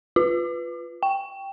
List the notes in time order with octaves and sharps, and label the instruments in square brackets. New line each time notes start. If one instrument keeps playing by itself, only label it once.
[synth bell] F4
G5